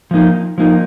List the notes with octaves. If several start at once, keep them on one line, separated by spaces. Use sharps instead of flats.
F3 A#3 D#4
F3 A#3 D#4